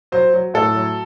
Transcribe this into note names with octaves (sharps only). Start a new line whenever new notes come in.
F#3 C5
F#3
A2 A4
F#3